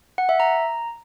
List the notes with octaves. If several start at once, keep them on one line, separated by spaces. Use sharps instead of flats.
F#5
E5
A#5